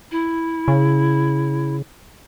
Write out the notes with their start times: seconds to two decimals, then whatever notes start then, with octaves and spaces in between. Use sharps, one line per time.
0.11 E4
0.68 C#3